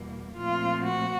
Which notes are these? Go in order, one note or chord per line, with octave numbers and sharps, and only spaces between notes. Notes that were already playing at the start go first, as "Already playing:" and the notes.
Already playing: E2 B2 G3 A#3
A#2 F3 A3 C4 F4
F#4